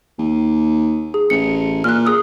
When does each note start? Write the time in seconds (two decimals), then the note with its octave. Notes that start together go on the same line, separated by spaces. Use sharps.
0.19 D#2
1.14 G#4
1.30 A1 C#7
1.84 A#2 F6 F#6
2.06 G#4 D#6 E6